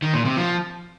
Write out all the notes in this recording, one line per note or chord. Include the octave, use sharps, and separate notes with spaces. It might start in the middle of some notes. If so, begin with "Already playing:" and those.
D#3
A#2
C3
F3